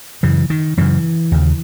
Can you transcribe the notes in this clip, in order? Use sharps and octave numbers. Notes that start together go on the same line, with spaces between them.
F#2 C#3 E3
D#3
F#2 C#3 E3
D#2 C#3